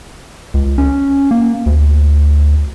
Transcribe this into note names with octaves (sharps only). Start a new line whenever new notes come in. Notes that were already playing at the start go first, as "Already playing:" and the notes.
C#2
C#4
A#3
D2